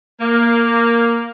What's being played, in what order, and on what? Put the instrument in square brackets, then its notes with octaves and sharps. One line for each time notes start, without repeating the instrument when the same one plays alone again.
[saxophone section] A#3